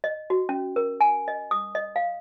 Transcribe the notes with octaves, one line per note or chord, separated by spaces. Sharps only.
D#5
F#4
C#4
A#4
G#5
D#5
D#6
D#5
F5